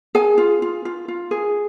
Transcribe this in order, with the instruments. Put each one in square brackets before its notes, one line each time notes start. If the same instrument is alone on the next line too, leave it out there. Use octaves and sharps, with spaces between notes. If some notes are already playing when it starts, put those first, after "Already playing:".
[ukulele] G#4 G#5
F4
F4
F4
F4
G#4